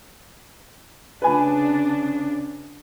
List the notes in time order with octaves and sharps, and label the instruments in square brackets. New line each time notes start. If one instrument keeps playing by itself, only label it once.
[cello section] C#3 D4 [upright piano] B4 G#5 B5